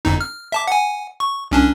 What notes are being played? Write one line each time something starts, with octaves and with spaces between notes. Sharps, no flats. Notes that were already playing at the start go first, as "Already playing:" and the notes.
G1 F2 D#4
F6
E5 A5 D6
F#5 G#5
C#6
C2 C#4 D4